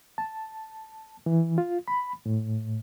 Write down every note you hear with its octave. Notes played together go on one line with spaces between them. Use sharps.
A5
E3
F4
B5
A2